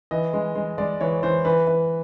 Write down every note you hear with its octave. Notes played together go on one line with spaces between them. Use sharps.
E3 D#5
G#3
G#3
G#3 D5
E3 C#5
E3 C5
E3 B4
E3